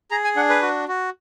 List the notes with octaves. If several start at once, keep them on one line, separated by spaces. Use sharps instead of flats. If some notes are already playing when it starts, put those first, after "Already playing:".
G#4 A#5
G#5
D4 F#5
B4
F#4
F#4